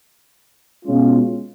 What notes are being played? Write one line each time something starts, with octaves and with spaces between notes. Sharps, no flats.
B2 G#3 C#4 F4